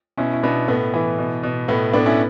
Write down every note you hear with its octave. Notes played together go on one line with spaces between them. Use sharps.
B2 C#4 E4
E4
B2 B3 D4
A2 B3
E3
B2
B2
A2 B3
A2 B3 D4
C#4 E4